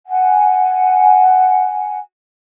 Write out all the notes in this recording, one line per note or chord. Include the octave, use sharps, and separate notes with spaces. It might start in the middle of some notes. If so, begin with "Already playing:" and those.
F#5 G#5